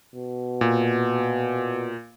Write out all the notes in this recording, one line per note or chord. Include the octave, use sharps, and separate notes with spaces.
B2
A#2